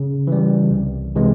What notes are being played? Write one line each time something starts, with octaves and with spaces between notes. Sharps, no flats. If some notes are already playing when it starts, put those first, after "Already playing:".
Already playing: C#3
E3 G3
C2
C3 E3 G#3